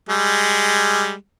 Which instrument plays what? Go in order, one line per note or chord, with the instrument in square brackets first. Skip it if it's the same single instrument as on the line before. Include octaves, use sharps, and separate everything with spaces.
[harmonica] G3 G#3